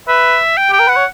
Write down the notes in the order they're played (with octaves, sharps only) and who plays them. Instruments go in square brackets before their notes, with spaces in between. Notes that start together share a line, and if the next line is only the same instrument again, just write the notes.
[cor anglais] B4 [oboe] E5
[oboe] G5
[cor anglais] G4 [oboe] G5
[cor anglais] A#4
[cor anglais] B4 [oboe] F#5
[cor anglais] C#5